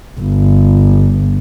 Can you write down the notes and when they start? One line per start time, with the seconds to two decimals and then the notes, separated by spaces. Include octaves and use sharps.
0.21 G1